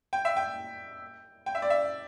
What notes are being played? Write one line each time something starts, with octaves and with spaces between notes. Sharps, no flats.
G5
E5
G5
G5
E5
D5
E5